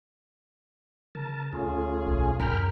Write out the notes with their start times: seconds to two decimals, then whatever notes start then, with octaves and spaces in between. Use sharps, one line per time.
1.15 C#3 A#4 A5
1.53 D2 A3 C#4 F4 G#4
2.06 B1
2.40 F#2 G#3 A#4 G5 B5 F6